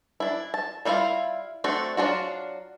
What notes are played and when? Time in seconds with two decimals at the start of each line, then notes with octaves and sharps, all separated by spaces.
0.20 D4 E4
0.54 A5
0.85 G3 D4 E4 F4 F5
1.64 A3 C4 D4 F#4 A4
1.97 F#3 D4 F4 F#4